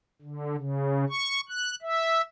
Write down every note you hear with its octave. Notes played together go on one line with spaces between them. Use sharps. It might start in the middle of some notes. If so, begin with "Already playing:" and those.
D3
C#3
C#6
F#6
E5